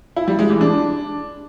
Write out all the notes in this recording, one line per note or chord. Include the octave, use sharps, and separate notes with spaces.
E4
G3
G#3
E3
D4